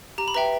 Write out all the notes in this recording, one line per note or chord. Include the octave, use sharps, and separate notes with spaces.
G4 A#5
B5
B4 E5 G5 A#5